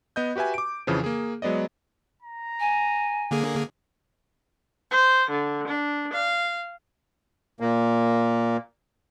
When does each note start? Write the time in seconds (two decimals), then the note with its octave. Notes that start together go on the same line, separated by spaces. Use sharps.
0.16 B3 D#5 G6
0.36 F#4 G4 B4 E5 G#5
0.54 D6 D7
0.87 F2 C#3 E3 F3
1.04 A#3 G#4
1.42 F#3 G#3 B3 D5 D#5
2.23 A#5
2.60 G#5
3.31 D3 A#3 G#4
4.91 C5
5.28 D3
5.67 D4
6.13 F5
7.60 A#2 A#3